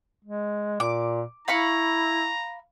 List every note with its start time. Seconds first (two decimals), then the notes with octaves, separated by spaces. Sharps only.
0.25 G#3
0.80 A#2 D6
1.48 E4 F5 A#5 B5 C#6